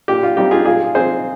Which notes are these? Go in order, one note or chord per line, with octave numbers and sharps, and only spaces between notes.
A#2 G4
F4
G3 C4 D#4 G4
F4 G#4
A#2 F4 G#4
F3 C4 D#4 G#4 C5